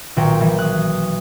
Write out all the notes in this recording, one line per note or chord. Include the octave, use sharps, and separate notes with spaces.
B1 A#2 D#3 F#4 G5
E3 G3
D#6 F#6